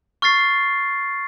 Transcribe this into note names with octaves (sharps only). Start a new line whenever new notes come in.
C#6 F6 A6 C7